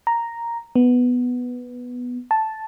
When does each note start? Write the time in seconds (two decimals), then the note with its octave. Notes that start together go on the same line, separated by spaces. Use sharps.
0.07 A#5
0.76 B3
2.31 A5